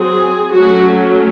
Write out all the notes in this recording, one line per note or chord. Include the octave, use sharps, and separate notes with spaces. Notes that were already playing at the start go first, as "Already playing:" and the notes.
Already playing: F#3 C4 G#4
F#3 A3 C#4 F#4